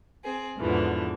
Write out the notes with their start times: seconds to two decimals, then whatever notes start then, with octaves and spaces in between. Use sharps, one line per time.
0.24 C4 G#4
0.57 E2 G#2 B2 D3 E3 F3